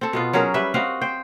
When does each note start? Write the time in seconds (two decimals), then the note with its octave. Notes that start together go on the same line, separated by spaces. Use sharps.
0.01 C4 A4
0.13 B2 B3 F4
0.33 F#3 C#4 G#4 A#4
0.54 G3 B4 E5
0.74 C4 F#4 D#5 F5
1.01 C5 G5